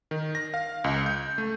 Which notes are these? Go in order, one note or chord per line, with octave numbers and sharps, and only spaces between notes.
D#3
A#6
F5
C#2
G6
A3